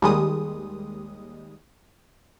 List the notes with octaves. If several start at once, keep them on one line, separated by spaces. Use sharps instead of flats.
D#2 G3 G#3 D#6